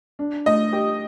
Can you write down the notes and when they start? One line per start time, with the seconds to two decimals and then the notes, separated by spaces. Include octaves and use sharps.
0.19 D4
0.46 A3 D#5
0.73 G4